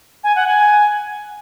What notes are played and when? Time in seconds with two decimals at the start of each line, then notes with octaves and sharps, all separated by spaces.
0.24 G#5
0.36 F#5
0.47 G#5